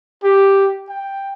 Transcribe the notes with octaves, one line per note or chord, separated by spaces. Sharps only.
G4
G5